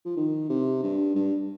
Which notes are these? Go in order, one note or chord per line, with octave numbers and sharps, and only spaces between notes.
F3
D#3
C3
G2
G2